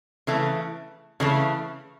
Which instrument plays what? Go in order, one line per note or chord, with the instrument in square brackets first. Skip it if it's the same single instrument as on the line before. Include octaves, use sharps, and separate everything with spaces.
[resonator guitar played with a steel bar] C#3 E3 A3
C#3 E3 A3